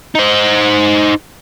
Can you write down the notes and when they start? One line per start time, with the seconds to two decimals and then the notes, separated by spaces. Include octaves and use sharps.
0.15 D#4 C5